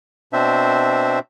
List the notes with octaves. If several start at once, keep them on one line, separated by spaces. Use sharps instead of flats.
B2 C4 D4 C5 E5